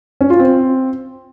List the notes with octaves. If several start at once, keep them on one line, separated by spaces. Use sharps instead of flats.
C#4
F4
C4